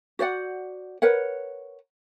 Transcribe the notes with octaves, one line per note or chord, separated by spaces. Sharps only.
F#4 C5 D5 F#5
A#4 B4 C#5 F#5